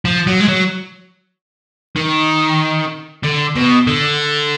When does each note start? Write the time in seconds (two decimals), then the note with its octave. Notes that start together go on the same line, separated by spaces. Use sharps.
0.05 F3
0.27 F#3
0.40 G#3
0.48 F#3
1.96 D#3
3.24 D3
3.55 B2
3.87 D3